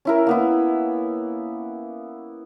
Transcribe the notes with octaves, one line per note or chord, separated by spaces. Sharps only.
C#4 E4 A#4
A#3 B3 E4